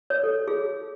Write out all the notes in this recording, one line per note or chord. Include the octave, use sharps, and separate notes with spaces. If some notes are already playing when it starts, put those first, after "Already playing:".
C#5
A4
G#4